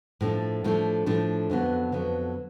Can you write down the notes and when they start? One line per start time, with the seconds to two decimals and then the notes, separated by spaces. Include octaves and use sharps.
0.21 A2 F3 A3 D4
0.64 A2 F3 A3 D4
1.06 A2 F3 A3 D4
1.50 F2 D3 F#3 B3
1.92 F2 D3 F#3 B3